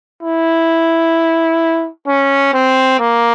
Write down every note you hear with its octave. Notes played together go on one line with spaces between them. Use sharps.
E4
C#4
C4
A#3